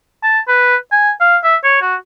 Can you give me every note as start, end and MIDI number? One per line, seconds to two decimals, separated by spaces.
0.24 0.40 81
0.48 0.76 71
0.92 1.11 80
1.21 1.37 77
1.43 1.56 76
1.64 1.78 73
1.82 1.95 66